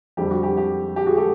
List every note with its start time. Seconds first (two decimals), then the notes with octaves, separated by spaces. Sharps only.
0.17 F2 D3 G3 G4
0.31 F#4
0.43 G4
0.57 G4
0.96 G4
1.06 F#4 G#4
1.17 G4 A4